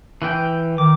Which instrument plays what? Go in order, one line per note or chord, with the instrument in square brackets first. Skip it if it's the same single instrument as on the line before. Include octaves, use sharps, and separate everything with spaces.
[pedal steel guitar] E3 B4 G5
[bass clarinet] D#3 [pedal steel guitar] D6